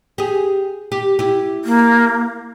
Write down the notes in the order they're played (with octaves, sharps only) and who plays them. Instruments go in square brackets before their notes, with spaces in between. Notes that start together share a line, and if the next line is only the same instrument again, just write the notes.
[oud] G4 G#4
G4
E4 G4
[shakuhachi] A#3